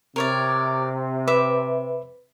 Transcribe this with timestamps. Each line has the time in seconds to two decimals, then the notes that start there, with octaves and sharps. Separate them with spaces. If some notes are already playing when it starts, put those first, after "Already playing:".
0.16 C3 A#4 C#5 D5
1.28 B4 E5 D6